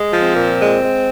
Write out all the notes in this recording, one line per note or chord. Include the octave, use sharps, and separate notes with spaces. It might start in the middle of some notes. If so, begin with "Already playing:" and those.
Already playing: G#3
F3
C4
A#2
G#3
G#3